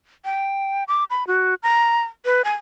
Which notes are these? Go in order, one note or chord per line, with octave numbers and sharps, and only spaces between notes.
G5
D6
B5
F#4
A#5
B4
G#5